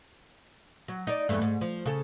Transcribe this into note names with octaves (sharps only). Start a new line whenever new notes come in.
F#3
D#4 D5
E2 G2 A3
G#2
F3
C#3 A4